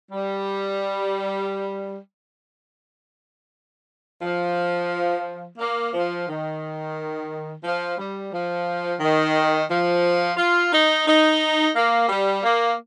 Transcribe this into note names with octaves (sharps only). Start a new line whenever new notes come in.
G3
F3
A#3
F3
D#3
F3
G3
F3
D#3
F3
F4
D#4
D#4
A#3
G3
A#3